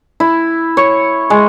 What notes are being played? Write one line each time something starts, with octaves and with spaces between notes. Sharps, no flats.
E4
C#5
G#3